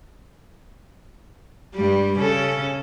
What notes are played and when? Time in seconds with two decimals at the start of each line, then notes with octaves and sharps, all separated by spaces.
1.75 G2 G3
2.18 C#3 C#4 A4